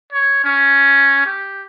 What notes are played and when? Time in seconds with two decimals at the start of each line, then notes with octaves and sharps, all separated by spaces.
0.13 C#5
0.44 C#4
1.26 G4